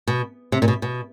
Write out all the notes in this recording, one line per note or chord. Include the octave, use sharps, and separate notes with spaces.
B2
C3
A#2
B2
B2